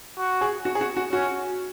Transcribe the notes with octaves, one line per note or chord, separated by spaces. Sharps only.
F#4
G#4
F#4
G#4
F#4
F#4
C#4 F#4